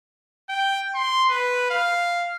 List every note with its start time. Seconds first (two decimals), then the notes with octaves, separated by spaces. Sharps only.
0.49 G5
0.95 C6
1.30 B4
1.70 F5